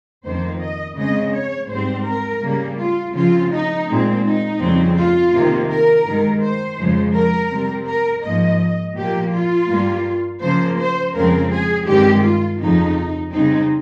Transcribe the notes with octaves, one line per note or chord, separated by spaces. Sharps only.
F2 D#3 A#3 C5
D#5
C#3 G#3 C4 D#5
C#5
G#2 G3 C4 C5
A#4
C#3 G3 A#3
F4
C#3 F3 C4 F4
D#4
A#2 G#3 C4
D#4
F2 C#3 G3 C4
F4
C3 D#3 A#3
A#4
G2 D#3 G#3
C5
F2 C#3 F3 G#3
A#4
C3 G3 C4
A#4
G#2 F3 A#3 D#5
A#2 F3 A#3 G4
F4
G2 G3 A#3
C#3 F3 A#3 C5
C5
F2 C#3 F3 G#3 C4 A#4
G#4
G2 D#3 G#3 C4 G4
F4
F2 C#3 F3 D#4
C#3 G3 C4 D#4